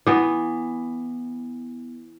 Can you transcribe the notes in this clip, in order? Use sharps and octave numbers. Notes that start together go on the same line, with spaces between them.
E3 B3